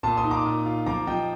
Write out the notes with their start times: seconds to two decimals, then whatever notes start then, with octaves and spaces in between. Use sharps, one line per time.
0.03 A#2 A5 C6
0.17 C6 D#6
0.24 D#4
0.31 A#5 D6
0.45 A#2
0.66 F4
0.86 F3 A#5 D6
1.07 F3 D#5 G5